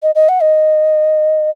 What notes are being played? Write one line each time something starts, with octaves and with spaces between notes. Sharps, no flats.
D#5
D#5
F#5
D#5